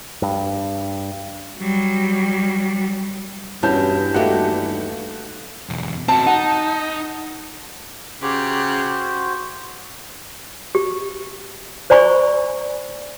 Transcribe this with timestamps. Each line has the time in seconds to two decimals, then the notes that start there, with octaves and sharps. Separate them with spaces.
0.22 G2
1.60 F#3 G3
3.63 E2 G2 C#4 E4 F#4 A5 G6
4.14 D#2 A3 D#4 F#4 G4
5.69 B1 E2
6.08 C4 F#4 A5
6.26 D#4 F#5
8.22 C#3 F#4 G4 C5
10.75 G4
11.90 C5 D5 G#5 B5 C#6